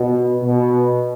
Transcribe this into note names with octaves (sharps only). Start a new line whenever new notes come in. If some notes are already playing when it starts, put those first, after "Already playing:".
Already playing: B2
B2